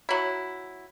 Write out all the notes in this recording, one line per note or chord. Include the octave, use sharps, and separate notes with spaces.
F#3 E4